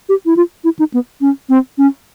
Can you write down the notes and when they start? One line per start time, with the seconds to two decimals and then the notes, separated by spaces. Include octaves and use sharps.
0.09 G4
0.26 E4
0.36 F4
0.64 E4
0.79 D#4
0.94 B3
1.21 C#4
1.49 C4
1.78 C#4